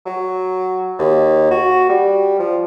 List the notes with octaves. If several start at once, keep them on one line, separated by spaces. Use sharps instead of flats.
F#3
D#2
F#4
G3
F3